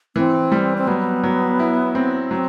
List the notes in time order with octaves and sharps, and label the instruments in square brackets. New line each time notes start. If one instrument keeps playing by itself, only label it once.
[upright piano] E3 [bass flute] C4
[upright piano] G3
[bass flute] C4
[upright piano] F#3 [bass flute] B3
[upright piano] F#3
E4
C4
[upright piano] F#3 [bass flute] C4